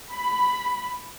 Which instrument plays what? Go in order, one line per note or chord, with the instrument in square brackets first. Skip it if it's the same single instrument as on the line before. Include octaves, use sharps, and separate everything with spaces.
[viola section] B5